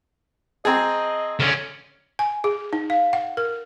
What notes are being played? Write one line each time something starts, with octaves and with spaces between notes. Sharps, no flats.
C4 G#4 D#5 A5 A#5
D3 C#4 C#6 F6
G#5
G#4
D#4
F5
F#5
A#4